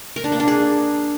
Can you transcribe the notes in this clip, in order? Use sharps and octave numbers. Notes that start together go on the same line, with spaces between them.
A#4
D4
A#3
D4
G#4